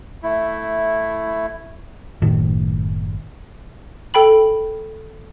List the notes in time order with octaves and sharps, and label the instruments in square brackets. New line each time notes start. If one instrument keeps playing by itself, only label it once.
[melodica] A3 E4
[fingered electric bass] F#1 A2 D#3
[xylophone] A4 G5 B5 F#7